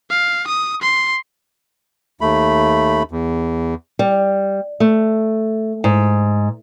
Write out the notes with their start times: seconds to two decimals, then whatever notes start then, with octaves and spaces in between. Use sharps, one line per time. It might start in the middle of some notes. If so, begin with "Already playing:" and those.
0.10 F5
0.47 D#6
0.82 C6
2.21 D#2 A3 B5
3.11 E2
3.99 G3
4.80 A3
5.84 G#2